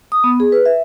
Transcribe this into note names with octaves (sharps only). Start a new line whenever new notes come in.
D#6
B3
G#4
B4
E5